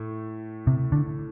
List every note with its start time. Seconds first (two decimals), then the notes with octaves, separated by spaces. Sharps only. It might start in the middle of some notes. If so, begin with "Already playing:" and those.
Already playing: A2 A3
0.67 C3
0.92 D3